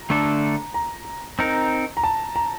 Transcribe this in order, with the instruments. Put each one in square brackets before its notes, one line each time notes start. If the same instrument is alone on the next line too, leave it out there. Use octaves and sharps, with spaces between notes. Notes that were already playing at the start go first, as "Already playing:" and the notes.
Already playing: [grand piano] A#5
[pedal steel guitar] D3 A3 D4 A4
[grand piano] A#5
[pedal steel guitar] C4 D#4 A#4
[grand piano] A#5
A5
A#5